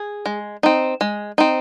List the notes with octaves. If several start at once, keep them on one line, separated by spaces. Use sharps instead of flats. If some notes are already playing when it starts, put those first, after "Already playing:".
Already playing: G#4
G#3
C4 D#4
G#3
C4 D#4